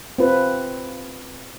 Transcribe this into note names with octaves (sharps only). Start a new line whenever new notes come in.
C4 F4 B4